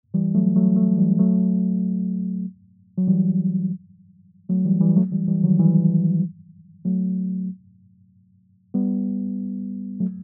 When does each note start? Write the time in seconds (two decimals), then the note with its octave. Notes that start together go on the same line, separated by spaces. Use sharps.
0.14 E3 G3
0.35 F#3 A3
0.56 F#3 A3
0.76 F#3 A3
0.98 E3 G3
1.19 F#3 A3
2.98 F#3
3.08 E3 G3
4.49 F#3 A3
4.65 E3 G3
4.81 E3 G3
4.96 F#3 A3
5.12 E3 G3
5.28 E3 G3
5.44 D#3 F#3
5.59 E3 G3
6.85 F#3 A3
8.74 G3 B3
10.00 F#3 A3